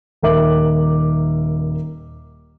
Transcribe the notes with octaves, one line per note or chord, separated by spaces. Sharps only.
D#1 D#3 A#4 E5 D6 F#7